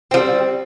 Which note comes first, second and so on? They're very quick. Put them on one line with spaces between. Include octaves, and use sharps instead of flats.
C4 F3 G3